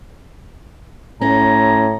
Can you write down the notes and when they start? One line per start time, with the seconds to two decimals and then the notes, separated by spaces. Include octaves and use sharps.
1.21 A2 C#4 A#5